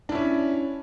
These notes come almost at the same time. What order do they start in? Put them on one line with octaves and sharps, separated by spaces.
D4 E4 C#4